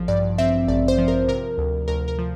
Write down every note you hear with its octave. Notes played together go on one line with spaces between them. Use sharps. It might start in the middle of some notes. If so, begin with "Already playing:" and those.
Already playing: A1 F3
G2 D5
C4 E5
A1 D5
C5
F3
A#4
C3 A#4
D2
D2 A#4
A#4
F3